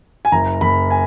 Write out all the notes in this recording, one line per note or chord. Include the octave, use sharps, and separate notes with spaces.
G#5
F#1 A#5
F#1 B5
G#5